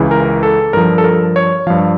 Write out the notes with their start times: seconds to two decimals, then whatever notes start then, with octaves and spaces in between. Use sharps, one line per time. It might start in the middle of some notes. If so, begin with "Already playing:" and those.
Already playing: C#2 C#3 E3
0.11 A#4
0.43 A4
0.73 G2 F3 A#4
0.98 A4
1.04 A#4
1.36 C#5
1.67 G2 F3 F5